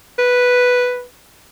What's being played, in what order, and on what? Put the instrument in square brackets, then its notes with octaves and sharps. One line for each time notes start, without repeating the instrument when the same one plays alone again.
[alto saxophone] B4